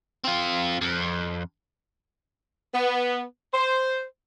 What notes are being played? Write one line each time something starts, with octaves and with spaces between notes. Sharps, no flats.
C4 F4
F2
B3
C5